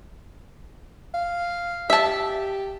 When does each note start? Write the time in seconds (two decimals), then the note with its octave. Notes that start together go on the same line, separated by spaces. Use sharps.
1.14 F5
1.90 G4 E5 A5